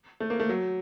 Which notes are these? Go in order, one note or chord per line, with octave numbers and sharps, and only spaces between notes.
A3
A#3
A3
F#3